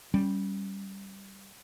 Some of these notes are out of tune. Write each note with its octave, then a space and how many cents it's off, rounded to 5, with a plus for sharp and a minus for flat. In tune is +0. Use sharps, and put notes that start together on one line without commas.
G3 -5 C#4 +0